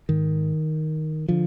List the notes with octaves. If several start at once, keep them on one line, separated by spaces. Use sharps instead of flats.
G#2 D#3
D3 F3